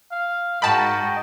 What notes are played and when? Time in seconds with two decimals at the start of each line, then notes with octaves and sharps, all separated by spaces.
0.11 F5
0.62 G#2 F#4 A#4 D#5 G5 A5 B5